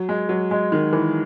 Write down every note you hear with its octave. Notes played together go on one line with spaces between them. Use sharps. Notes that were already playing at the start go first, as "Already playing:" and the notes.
Already playing: F#3
G#3
F#3
G#3
D#3
E3